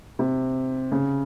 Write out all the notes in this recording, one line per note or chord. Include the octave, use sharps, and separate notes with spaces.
C3
C#3